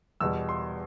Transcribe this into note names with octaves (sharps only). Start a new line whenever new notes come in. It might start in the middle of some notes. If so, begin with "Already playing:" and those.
E2 B2 G3 E6
C6